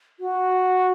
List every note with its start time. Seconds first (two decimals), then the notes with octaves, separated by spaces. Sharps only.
0.19 F#4